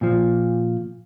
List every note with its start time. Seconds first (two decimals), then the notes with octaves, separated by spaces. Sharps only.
0.01 A#2 F3